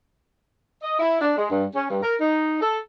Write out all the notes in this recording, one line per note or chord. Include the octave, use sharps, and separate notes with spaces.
D#5
E4
D4
G#3
G2
C#4
G2
A#4
D#4
A4